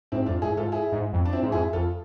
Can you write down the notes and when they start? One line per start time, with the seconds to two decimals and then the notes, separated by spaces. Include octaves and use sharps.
0.12 G#2 C4 E4
0.26 F2 D4 F4
0.42 G#2 E4 G#4
0.57 G#2 F4 A4
0.72 E4 G#4
0.92 G#2
1.13 F2
1.25 D4
1.33 C4 E4
1.43 G#2
1.52 F2 E4 G#4
1.73 F2 F4 A4